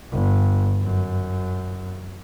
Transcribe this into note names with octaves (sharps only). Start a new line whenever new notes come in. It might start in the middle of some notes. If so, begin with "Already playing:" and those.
G1
F#2